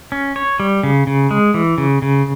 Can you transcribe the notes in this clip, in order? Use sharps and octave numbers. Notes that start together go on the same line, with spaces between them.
C#4
C#5
G3
C#3
C#3
G#3
E3
C#3
C#3